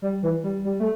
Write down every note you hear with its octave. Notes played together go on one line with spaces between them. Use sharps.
G3
E3
G3
G3
A3